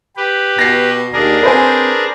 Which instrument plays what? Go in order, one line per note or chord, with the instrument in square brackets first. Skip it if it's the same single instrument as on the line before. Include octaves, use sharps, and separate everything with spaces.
[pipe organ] G4 B4
[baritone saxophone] B2 [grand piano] A#6 C7
[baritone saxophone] D#2 [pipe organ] D4 G#4 A#4
[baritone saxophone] C4 [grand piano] B4 C5 G#5